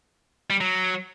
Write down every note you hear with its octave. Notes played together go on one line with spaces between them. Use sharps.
G3
F#3